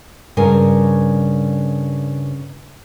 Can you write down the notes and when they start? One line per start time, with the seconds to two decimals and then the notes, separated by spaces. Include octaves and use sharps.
0.37 G2 C#3 A#4 G#5